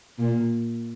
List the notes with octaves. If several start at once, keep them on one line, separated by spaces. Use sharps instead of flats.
A#2